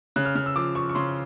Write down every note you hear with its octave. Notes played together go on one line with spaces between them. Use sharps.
C#3 F#6
F6
C#3 F6
E6
F3 D6
F3 C#6
C#6
C#3 C6